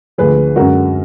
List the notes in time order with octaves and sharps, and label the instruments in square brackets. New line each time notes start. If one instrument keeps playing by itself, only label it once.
[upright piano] D2 D3 F3 G#4 B4
F#2 D3 G#3 F#4 A#4